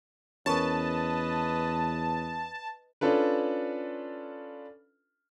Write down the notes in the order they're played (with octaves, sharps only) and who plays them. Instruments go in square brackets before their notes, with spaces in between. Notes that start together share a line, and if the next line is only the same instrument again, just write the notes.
[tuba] E2 [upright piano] C#4 A#4 C#6 [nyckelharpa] B4 D#5 [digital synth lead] A5
[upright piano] C#4 D4 F4 A4 B4